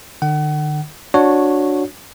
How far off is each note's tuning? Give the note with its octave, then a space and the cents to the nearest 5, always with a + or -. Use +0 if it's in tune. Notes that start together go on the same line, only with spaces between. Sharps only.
D3 +45 F#5 +35
D4 +0 F#4 -15 C#5 +0